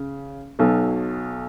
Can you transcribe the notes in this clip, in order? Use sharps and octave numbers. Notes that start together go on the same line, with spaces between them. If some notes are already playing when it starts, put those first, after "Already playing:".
Already playing: C#3
B1 B2 F#3